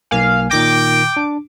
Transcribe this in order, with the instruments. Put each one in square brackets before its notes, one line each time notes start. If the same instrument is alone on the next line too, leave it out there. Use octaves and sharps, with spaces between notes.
[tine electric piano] B1 A#3 G#5 [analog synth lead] F5
[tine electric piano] A#2 D#3 A#6 [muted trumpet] G5 [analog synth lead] D6
[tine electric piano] D4